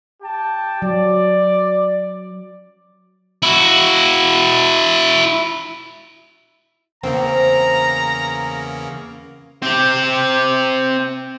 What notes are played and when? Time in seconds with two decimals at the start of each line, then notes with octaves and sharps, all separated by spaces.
0.22 G4 G5 A5
0.82 F#3 D5
3.43 E4 F#4
7.03 E2 C#3 A#3 C4 A#5
9.62 C4 G4